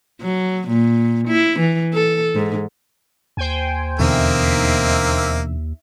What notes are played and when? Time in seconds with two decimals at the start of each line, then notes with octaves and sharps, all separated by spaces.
0.21 F#3
0.68 A#2
1.28 E4
1.60 E3
1.93 A4
2.35 G#2
3.37 D#2 C5 G5 G#5
3.99 E2 B2 D3 A#3 C4 D#4 E5